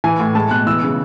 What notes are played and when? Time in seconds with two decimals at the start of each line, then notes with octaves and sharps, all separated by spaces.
0.04 E3 G#5
0.19 A2
0.35 G#3 A5
0.51 B2 F#6
0.67 E3 E6
0.83 C#3